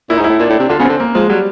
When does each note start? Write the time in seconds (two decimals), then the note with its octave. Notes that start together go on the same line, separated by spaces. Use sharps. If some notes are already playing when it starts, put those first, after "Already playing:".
0.10 A#2 E4
0.18 G#2 D#4
0.24 E4
0.29 A2
0.40 A#2 D4
0.50 A2
0.59 C3
0.69 D3 F4
0.80 C#3 B3
0.85 D3 C4
1.00 A#3
1.15 F3 G#3
1.30 F#3 G3